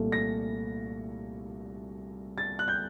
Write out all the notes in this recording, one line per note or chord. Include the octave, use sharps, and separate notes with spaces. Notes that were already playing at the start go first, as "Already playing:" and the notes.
Already playing: C2 A#2 A3
A#6
A6
F#6
G6